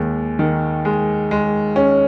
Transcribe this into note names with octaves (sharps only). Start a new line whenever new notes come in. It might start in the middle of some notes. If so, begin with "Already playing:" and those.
Already playing: D#2 G#3
D#3
G#3
G#3
C#4